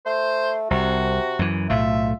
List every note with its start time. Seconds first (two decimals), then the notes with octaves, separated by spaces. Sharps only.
0.06 A3 C5
0.71 C2 C3 F#4
1.39 F#2 E3
1.70 B1 A2 A3 F4 E5